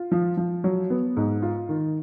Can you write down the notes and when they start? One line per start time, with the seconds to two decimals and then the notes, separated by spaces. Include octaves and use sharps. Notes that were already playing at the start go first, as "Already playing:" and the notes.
Already playing: F4
0.12 F3
0.37 F3
0.64 F#3
0.90 B3
1.17 G#2
1.42 F4
1.69 D#3